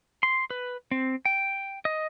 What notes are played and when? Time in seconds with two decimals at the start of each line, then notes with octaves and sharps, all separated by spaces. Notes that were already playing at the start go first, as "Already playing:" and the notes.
0.23 C6
0.50 B4
0.91 C4
1.25 G5
1.85 D#5